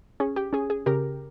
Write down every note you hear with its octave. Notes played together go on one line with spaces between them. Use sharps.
C#4 G#4
G4
C#4 G#4
G#4
C#3 G4 A#4